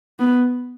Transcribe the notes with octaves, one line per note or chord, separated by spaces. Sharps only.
B3